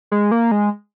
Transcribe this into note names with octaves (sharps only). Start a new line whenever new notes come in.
G#3
A#3
G#3